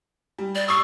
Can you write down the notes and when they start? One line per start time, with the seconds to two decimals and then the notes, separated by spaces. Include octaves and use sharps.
0.38 G3
0.55 D5
0.68 C#6 D#6 E6 C7